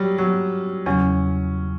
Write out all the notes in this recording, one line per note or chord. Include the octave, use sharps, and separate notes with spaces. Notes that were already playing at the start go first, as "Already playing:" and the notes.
Already playing: F#3 G3
F#3
E2 C#3 F#3 C#4